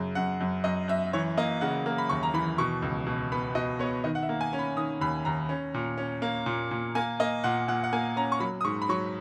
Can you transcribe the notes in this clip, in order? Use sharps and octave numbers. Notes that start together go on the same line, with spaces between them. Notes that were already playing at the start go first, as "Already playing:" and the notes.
Already playing: F#2 C#3
F#2 F#5
F#2
F#2 D#5
F#2 E5
E3 C#5
A#3 D#5
C#3 F#5
A#3
B5
D#2 C#6
A#5
E3 B5
B2 C#6
C#2
B2
B3 B5
B2 D#5
B3 C#5
D#3 D#5
F#5
E5
A#3
G#5
C#4
B5
D#3 D#6
D#2 B5
D#2 A#5
C#4
A#2
C#4
A#3
A#2
A#2
A#3 G#5
A#3 D#5
A#2 F#5
A#2 F#5
F#5
A#3 G#5
C#4 A#5
C#6
F#3 B5
D#6
G#2 C#6
B5
F#3 C#6